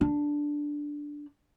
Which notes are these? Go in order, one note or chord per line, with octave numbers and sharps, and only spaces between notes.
D4